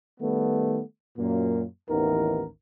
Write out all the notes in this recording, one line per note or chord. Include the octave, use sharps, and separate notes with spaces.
D#3 G3 A3 B3
F#2 A#2 A#3
A1 D#2 D#3 E3 B3 A#4